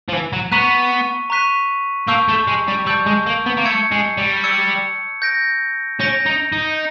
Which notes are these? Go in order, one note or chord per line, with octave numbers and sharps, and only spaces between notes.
F3
E3
F#3
B3 A#5 C#6 F#6 B6 D#7
A#5 C#6 F#6 B6 D#7
A#3 A5 C#6 E6 G6
A3
G#3
G3
G3 A5 C#6 E6 G6
G#3
A#3
B3
A#3
A3 E6 G#6 C#7
G#3
G3
E6 G#6 C#7
G6 A#6 D7
C#4 G6 A#6 D7
D#4
D#4